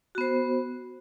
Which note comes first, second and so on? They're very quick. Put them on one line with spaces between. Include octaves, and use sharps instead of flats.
F#4 B3 C5